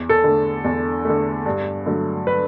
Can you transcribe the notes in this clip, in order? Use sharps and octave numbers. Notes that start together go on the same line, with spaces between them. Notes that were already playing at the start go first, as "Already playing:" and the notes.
Already playing: E2
A4
D3 A3
E2
D3 A3
G2
D3 F#3 A3
B4